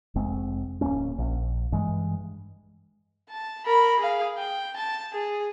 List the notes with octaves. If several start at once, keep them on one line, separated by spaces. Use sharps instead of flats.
F1 G#3 C4
D1 G1 A#3 C#4
A#1
G2 E3 G#3
A5
A#4 B5
G#4 F5
G5
A5
G#4